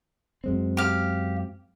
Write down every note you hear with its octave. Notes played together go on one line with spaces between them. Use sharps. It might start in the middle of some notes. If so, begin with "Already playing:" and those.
F#2 G#3 C4
G4 F5